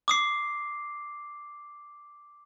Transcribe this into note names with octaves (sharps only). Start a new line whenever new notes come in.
D6 D#6 C7